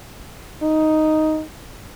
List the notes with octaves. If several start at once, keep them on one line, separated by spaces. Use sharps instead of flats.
D#4